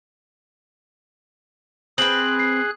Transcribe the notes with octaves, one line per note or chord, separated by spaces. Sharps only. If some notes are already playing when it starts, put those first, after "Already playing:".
C4 G#4 B4 F#6 F#7
C7